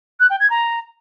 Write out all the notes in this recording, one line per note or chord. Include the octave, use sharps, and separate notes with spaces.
F#6
G5
G#6
A#5